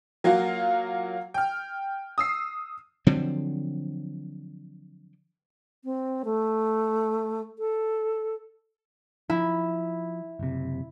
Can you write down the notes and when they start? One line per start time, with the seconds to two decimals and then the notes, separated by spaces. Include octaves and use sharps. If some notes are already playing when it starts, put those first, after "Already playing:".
0.24 F#3 A#3 F4 F#4 F5
1.34 G5 F6
2.18 D#6 E6 C7
3.07 D3 F3 F#3 C4
5.84 C4
6.25 A3
7.59 A4
9.30 F3 E4
10.39 F#1 C3